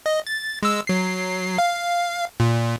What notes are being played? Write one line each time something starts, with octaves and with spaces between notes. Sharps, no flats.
D#5
A6
G#3 E6
F#3 C7
F5
A#2